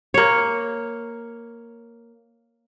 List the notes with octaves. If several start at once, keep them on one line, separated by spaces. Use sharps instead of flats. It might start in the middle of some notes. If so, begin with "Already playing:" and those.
A#3 C#5